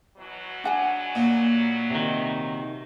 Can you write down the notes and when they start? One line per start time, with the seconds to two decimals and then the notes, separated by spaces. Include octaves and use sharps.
0.18 B2 E3 F#3
0.64 D4 F#5 G#5
1.15 A#2
1.90 C3 D#3